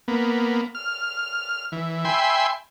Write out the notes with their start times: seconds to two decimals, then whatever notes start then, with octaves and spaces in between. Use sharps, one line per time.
0.08 A#3 B3
0.75 F6
1.72 E3
2.05 E5 G5 G#5 B5 C6